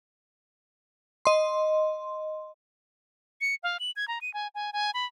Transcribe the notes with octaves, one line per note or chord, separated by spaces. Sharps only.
D#5 C6
C#7
F5
F#7
G#6
A#5
D#7
G#5
G#5
G#5
B5